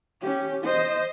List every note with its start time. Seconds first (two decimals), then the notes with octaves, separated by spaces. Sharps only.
0.21 C#4 G4
0.63 C5 D#5